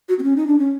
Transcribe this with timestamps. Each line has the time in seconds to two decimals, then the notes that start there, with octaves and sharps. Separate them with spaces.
0.09 F#4
0.19 C4
0.24 C#4
0.36 D#4
0.47 D4
0.58 C#4